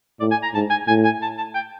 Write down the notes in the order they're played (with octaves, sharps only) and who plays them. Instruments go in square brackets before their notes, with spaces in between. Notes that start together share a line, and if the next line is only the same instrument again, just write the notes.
[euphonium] A2 [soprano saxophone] D5
[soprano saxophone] G#5
A#5
[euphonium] G#2 [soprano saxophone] A5
[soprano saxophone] G#5
[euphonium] A2 [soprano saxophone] G#5
[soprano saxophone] G#5
A5
A5
G5